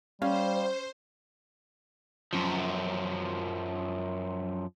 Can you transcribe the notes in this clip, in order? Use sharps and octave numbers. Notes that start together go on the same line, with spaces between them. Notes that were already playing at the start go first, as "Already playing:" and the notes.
G3 C#4 C5 F5
F#2 F3